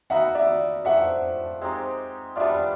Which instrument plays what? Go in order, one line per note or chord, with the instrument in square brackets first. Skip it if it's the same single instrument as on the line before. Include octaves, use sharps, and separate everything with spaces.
[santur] A#3 D#4 F#4 B4 [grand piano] E5 F#5
[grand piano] D5 E5
[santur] F3 A3 D4 G4 [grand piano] E5 F#5
[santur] G#3 C4 D#4 G4
[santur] G3 B3 D4 F4 [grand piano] D5 E5